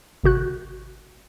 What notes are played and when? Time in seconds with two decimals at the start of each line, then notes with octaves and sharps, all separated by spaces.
0.23 G#1 C3 F#4 F#6